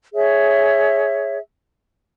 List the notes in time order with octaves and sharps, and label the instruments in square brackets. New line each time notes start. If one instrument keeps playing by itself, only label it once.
[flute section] G#4 C#5 E5